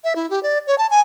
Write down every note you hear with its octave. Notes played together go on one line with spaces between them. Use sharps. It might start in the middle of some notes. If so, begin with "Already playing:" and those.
E5
E4
G4
D5
C#5
A5
G#5